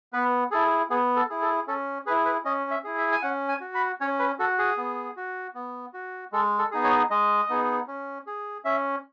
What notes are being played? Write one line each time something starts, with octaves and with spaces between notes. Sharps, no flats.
B3 B4
E4 G#4 A4
B3 G#4
A4
E4 G#4
A4
C#4 A4
E4 G#4 B4
B4
C#4 D#5
E5
E4 G#4
E5
G#5
C#4 F#5
G#5
F#4
B5
C#4 C#5
B4
F#4 A4
G#4
B3
F#4
B3
F#4
G#3 A4
A4
B3 D#4 G#4
C#5
G#3 D#5
B3 D#4 G#4
C#4
G#4
C#4 E5